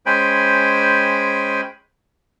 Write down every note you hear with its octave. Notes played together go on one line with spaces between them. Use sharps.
G#3 C#4 C5 G5 G#5 B5